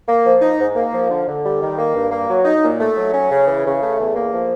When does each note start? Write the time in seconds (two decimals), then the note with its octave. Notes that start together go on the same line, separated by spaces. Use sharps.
0.08 A#3
0.25 F3
0.41 D#4
0.59 G#2
0.75 A#3
0.93 F3
1.10 D3
1.27 D3
1.44 G3
1.61 D#3
1.78 A#3
1.94 G2
2.11 A#3
2.29 F#3
2.45 D#4
2.63 A#2
2.80 A3
2.96 F#3
3.13 C#4
3.30 C#3
3.47 E3
3.65 C#3
3.82 A3
3.98 E2
4.15 A#3
4.33 F3